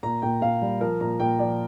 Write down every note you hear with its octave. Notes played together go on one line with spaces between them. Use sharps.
A#2 A#5
A#2 G5
A#2 F5
G3
F3 A#4
A#2 A#5
A#2 G5
F3 D5